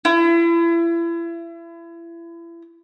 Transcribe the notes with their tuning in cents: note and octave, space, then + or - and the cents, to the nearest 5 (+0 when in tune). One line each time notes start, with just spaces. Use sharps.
E4 +35